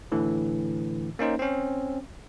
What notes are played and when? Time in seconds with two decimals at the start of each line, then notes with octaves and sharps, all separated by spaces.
0.12 A2 D3 E3
1.19 A#3 C#4 D#4 C5
1.39 C4 C#4